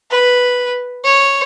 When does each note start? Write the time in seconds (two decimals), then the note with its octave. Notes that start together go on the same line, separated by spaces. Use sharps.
0.11 B4
1.04 C#5